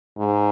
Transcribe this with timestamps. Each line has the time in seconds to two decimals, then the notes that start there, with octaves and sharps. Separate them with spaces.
0.18 G#2